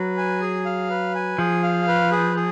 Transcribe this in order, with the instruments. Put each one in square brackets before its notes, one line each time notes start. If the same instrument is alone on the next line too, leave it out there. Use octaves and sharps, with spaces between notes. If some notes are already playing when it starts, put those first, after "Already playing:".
Already playing: [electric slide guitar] F#3 [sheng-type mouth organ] B4
[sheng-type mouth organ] G#5
G#4
F5
B4
G#5
[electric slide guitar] F3 [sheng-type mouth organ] G#4
[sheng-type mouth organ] F5
B4
G#4
G#4